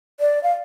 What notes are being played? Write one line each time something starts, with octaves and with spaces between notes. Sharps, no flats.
D5
F5